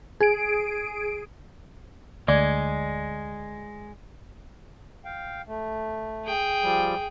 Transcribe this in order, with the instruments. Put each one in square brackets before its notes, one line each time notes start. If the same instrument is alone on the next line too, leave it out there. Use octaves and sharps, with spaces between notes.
[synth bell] G#4 D7
[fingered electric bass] D2 [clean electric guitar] G#3 [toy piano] D5 D6
[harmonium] F5 G5
A3
[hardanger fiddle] G#4 G5
[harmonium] F3 G3